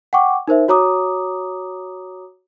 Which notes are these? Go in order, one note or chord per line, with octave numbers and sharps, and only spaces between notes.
F#5 G5 C#6 D6
D#4 A#4 C5 E5
F#4 C#5 A#5 D6 D#6